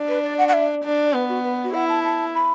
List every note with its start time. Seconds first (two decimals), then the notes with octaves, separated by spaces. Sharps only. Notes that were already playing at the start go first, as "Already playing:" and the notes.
Already playing: D4
0.08 B4
0.23 D5
0.38 F#5
0.48 F#5
0.53 E5
0.84 D4
1.04 D5
1.14 B3 B4
1.29 F#4
1.44 B4
1.64 F#4
1.74 E4 F#5
1.89 A5
2.04 A5
2.34 B5